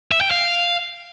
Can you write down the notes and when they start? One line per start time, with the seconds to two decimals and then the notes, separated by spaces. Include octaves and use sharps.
0.11 E5
0.21 G5
0.31 F5